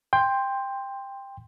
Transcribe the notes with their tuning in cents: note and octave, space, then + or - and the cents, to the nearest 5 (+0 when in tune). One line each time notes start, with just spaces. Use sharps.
G5 +15 C6 +0